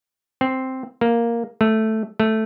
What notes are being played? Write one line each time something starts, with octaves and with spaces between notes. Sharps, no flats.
C4
A#3
A3
A3